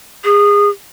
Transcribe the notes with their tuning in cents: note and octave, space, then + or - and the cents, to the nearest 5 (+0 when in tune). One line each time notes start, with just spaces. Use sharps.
G#4 -25